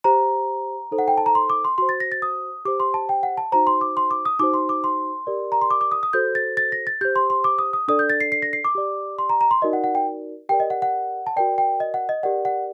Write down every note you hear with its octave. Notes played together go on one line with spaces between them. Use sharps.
G4 C5 A#5
D#4 A4 C5
F#5
G5
A5
A#5
C6
D6
C6
F#4 C5 C6
A6
A#6
A6
D#6
G4 C5 D6
C6
A5
G5
F#5
A5
D#4 F#4 C5 A#5
C6
D6
C6
D6
D#6
D#4 F#4 C5 D6
C6
D6
C6
G4 A#4 D5
A#5
C6
D6
D6
D#6
D#6
F#4 A4 C5 G6
A6
A6
A#6
A6
G4 C5 G6
C6
C6
D6
D#6
D#6
D4 A4 D5 D#6
G6
A6
C7
C7
A#6
C7
D6
G4 D5
C6
A#5
A#5
C6
D#4 F#4 A#4 D5 D#5
F#5
F#5
G5
G4 A#4 D5 G5
D#5
F#5
F#5
A5
F#4 A#4 D5 G5
G5
D#5
F#5
D#5
G4 A#4 D5 F#5
F#5